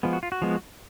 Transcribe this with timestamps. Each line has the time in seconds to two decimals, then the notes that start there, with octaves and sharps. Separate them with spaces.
0.03 F3 G#3 B3
0.13 F#4
0.23 F4
0.32 F#4
0.42 F3 G#3 B3